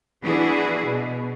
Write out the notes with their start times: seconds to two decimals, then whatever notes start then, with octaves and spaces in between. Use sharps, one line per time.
0.23 E3 B3 D4 E4 F#4 G#4
0.86 B2